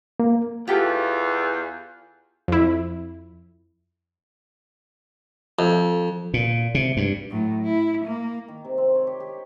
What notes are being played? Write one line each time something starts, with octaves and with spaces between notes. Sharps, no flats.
A#3
E2 F4 G4 A4
F2 E4
F2
A#2
C3
G2
A2 F#3
E4
A#3
D#3
C3
C4
C#5
G4
G4